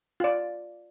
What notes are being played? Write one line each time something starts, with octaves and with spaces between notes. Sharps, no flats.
F4 D5